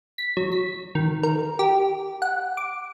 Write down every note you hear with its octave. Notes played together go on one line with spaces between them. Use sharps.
B6
F#3
B6
D#3
A#4
G4
F#5
D6